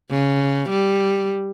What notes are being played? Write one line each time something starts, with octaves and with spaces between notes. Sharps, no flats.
C#3
G3